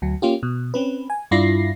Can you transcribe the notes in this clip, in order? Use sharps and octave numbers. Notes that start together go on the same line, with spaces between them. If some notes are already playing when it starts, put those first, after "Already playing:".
D2 F#3
A#3 C#4 F4 G4
B2
C4 C#4 B4
G#5
G2 D4 E4 F4 A#6 C7